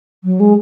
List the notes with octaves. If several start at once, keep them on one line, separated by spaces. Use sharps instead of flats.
F#3
G#3